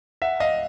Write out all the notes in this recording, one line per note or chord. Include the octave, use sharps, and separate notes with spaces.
E5 F#5
D#5 F5